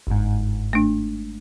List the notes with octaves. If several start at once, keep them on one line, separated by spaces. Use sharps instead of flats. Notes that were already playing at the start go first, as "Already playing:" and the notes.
G1 G#2
A3 D4